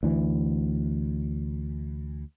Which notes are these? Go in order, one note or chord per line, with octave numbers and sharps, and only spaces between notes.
D2 E3